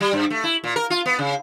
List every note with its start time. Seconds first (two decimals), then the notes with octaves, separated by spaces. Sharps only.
0.01 G3
0.13 G2
0.30 A3
0.44 E4
0.64 A#2
0.76 A#4
0.90 F4
1.06 B3
1.19 C#3